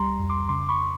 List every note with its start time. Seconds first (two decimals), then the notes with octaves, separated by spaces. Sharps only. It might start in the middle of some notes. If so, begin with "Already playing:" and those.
Already playing: C#2 G3 A#5 C6
0.19 F2
0.30 C6 D6
0.49 C#3 C6 D6
0.69 B5 C#6